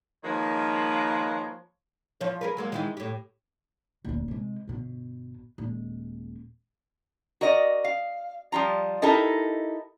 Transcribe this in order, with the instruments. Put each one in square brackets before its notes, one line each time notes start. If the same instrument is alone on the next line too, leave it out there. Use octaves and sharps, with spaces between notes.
[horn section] D#3 F3 G#3 A#3 B4 C#5
[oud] E2 F3 C#5
G#4 A#4 B4
F#3 G#3 A#3
D#3 E3 G#3
A2 G4
[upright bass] D#1 D2
C3 G#3
G1 B2
D#1 G#3
[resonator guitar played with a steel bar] F#4 A#4 D5 D#5
F5
F3 G3 F4 A#5
D#4 E4 G4 A4 A#4 D#5